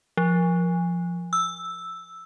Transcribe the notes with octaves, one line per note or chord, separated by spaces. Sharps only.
F3
E6